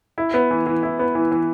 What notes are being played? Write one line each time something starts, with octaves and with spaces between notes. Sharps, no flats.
E4
B3
E3
E3
E4
B3
E3
E3